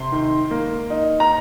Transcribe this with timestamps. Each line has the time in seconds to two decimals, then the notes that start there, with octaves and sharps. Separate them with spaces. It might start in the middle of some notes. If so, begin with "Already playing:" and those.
Already playing: C3 C6
0.12 D#3
0.51 A#3
0.90 D#4
1.20 A#5